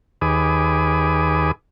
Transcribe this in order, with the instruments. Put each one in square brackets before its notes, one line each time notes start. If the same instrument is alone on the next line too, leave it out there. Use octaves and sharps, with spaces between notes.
[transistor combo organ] D#2 G#4 B4 D6 D#6